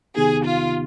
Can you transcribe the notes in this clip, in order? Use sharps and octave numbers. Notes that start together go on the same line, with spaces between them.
C3 D#3 B3 D#4 G4 G#4
F4